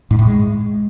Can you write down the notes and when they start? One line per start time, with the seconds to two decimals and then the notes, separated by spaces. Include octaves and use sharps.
0.11 G#2
0.19 A2
0.27 G#3